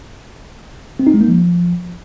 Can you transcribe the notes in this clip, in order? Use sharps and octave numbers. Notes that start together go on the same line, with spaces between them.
C4
D#4
G#3
A#3
F3